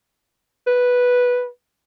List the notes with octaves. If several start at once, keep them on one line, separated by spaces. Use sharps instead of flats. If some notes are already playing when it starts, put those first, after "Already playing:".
B4